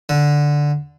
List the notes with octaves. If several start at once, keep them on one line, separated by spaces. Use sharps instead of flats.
D3